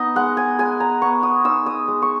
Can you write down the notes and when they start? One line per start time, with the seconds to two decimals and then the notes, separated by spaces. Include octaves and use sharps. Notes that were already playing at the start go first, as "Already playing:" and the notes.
Already playing: B3 D#4 D#5
0.16 G#3 F#5
0.37 G#5
0.59 G#3 G#5
0.80 A#5
1.02 B3 C#6
1.23 D#6
1.45 D#4 E6
1.66 D#6
1.88 G#3
2.02 C#6